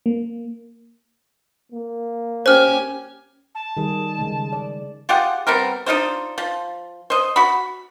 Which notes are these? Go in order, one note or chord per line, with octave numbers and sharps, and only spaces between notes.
A#3
A#3
C#4 G4 C5 G#5 F6
A5
D#3 G3 G#4
C#3 G#3
D5
F4 G4 G#4 F#5
G3 B3 C4 A#4
D4 D#4 F4 C5
F3
C5 D#5
F#4 B5